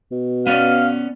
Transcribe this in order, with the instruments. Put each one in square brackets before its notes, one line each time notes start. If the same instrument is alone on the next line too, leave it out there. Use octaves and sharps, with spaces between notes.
[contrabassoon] B2
[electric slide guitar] B3 C#4 D5 [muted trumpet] F5